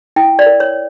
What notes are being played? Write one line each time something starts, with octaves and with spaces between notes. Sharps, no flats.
E4 G5
D5
A#4
C#5